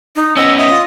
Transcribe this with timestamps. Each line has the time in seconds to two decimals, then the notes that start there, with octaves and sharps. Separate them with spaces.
0.16 D#4
0.37 B3 C#4 D#5 E6
0.58 D#5 E5
0.70 F4